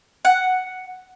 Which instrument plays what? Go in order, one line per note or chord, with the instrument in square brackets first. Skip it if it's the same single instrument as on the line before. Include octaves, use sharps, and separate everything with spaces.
[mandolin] F#5